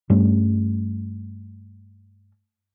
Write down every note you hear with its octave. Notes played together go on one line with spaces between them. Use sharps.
G2 G3 A3 C#4